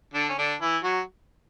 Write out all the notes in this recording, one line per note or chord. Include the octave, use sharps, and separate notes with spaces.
D3 D4
C#4
D3 D4
E3 E4
F#3 F#4